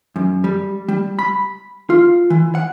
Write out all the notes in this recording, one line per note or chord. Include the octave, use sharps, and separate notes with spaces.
F#2
G3
G3
B5
F4
E3
F#5